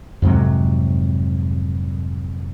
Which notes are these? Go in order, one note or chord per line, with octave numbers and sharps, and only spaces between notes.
F2 G#2 C3 F#3